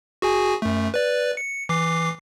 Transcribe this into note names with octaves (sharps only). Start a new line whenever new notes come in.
F#4 G#4 G#5
F#2 A3
B4 D5
C#7
E3 D6 C7